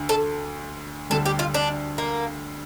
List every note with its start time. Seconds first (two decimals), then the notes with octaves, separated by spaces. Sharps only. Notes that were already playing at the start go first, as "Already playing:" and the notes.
Already playing: D2 D3
0.09 A4
1.10 D2 D3 G3 A4
1.26 G4
1.39 F4
1.54 D4
1.98 A#3